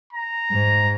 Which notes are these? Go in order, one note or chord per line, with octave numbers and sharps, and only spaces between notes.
A#5
G#2